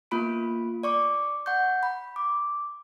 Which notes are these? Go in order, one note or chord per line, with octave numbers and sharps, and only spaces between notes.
A#3 B3 F4 B5 D7
D5 C#6 D6
F#5 C#6 G6
B5
D6